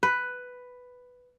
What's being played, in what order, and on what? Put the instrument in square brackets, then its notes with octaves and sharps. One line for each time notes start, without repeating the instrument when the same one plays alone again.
[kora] B4